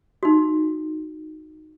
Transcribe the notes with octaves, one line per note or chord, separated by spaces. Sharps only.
D#4 F#4